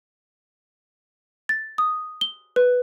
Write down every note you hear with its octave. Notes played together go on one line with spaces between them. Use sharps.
A6
D#6
G7
B4